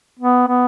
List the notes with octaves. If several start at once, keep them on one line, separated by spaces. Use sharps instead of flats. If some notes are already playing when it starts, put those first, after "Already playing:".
B3
B3